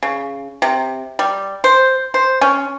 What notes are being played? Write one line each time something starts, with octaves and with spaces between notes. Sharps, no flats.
C#3
C3
G3
C5
C5
C#4